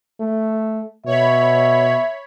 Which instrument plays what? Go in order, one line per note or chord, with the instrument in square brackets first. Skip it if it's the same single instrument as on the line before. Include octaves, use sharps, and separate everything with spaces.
[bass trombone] A3
[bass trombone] B2 [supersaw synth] C#5 B5 [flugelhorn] E5